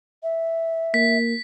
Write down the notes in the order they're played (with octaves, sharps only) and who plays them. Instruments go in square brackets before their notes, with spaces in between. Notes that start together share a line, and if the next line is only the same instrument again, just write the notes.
[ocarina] E5
[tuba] A#3 [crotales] B6